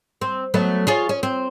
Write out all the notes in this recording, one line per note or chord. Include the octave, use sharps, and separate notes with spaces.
C4
F#3 A3 B3
F4 G#4 C#5
C#4
C4